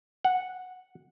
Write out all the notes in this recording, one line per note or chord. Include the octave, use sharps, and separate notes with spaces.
F#5